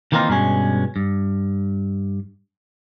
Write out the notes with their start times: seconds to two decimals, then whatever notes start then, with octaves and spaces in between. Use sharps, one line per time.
0.12 D#3 E3 A#3 C4 D#4 F4
0.29 G2 B2 G#3 C#4
0.96 G2